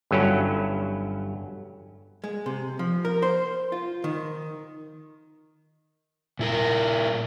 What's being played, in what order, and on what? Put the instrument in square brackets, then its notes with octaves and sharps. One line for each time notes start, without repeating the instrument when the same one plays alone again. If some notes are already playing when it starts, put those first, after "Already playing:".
[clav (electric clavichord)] G1 G2 F#3 C#4 E4
[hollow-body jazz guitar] G#3
C3
F3
A#4
C5
F4
D#3
[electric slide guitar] A#2 E4 A#4